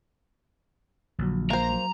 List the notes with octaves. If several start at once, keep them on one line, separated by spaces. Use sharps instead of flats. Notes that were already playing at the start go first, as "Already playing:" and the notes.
A#1 D3 F#3
A#3 C5 A#5
F#3